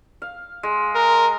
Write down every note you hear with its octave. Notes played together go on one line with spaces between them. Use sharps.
F5
G#3
A#4